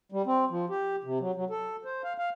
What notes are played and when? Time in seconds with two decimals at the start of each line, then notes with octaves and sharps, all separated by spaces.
0.12 G3
0.26 C4
0.50 F3
0.70 G4
1.04 C3
1.20 F#3
1.35 F#3
1.50 A4
1.85 C5
2.04 F5
2.18 F5